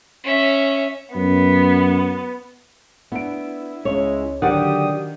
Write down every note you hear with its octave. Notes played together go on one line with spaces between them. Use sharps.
C#4 E5
F#2 B3
B3 D4 E4 D7
C#2 G#3 C#5
D3 D#3 F#3 D4 G4 D5 F#5 D#6